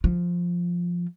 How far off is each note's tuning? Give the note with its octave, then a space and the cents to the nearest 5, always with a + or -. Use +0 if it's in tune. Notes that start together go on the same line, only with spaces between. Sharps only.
F3 +0 F4 +0